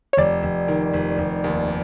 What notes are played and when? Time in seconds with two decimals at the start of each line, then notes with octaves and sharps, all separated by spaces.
0.13 C#5
0.17 F1 D5
0.43 F1
0.68 D#3
0.93 F1
1.18 F1
1.44 D#2